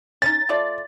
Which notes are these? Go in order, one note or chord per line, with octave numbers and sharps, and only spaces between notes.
C#4 D#4 A6
A3 F4 D5